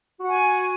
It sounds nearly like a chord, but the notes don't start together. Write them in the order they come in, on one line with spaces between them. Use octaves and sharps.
F#4 F#5 G#5